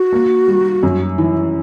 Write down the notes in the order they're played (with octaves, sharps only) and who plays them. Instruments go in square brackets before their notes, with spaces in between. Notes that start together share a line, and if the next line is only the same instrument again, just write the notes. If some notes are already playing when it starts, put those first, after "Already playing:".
Already playing: [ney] F#4
[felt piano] A#3
G3
F#2
E3